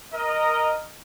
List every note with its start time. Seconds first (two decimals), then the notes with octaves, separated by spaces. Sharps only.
0.14 A#4 D#5